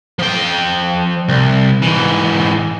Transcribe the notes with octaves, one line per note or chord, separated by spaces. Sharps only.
F3 G5
C2
G#2 E3